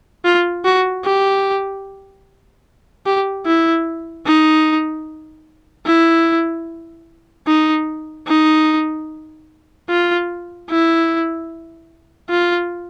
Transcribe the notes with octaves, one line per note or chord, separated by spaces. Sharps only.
F4
F#4
G4
G4
E4
D#4
E4
D#4
D#4
F4
E4
F4